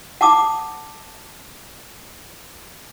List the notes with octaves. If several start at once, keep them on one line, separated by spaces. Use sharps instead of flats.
F#5 A5 D6 D#6